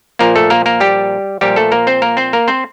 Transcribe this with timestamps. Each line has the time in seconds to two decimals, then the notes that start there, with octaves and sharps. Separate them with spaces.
0.19 A#2 F3 A#3 A#4
0.36 A3 A4
0.50 A#3 A#4
0.66 A#3 A#4
0.80 G3 G4
1.41 A#2 F3 G3 G4
1.56 A3 A4
1.72 A#3 A#4
1.87 C4 C5
2.02 A#3 A#4
2.17 C4 C5
2.33 A#3 A#4
2.48 C4 C5